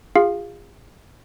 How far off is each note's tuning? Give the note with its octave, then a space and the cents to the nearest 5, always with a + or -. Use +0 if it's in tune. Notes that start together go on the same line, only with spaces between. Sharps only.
F4 +0 G#4 -35 F5 +0